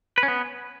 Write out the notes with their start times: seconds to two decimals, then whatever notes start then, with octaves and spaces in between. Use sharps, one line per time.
0.18 B4
0.23 C#4
0.28 B3